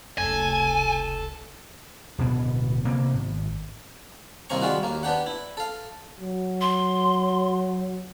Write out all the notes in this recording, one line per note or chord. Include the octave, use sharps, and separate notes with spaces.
F1 C#2 A4 G#5
D1 B2 B3
C3 A#3 B3
G#1
C2 D#3 A#3 C4 A#5 C#6
G3 G#3 F4 F#4
D#2 A#3
B3 D4 G4 F#5
E4
A4 F5
F#3
C6